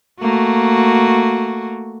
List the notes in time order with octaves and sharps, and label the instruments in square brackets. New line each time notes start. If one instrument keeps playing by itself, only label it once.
[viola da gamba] A3 A#3 F#4